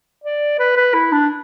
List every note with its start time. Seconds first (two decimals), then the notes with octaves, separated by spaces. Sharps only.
0.24 D5
0.59 B4
0.77 B4
0.94 E4
1.12 D4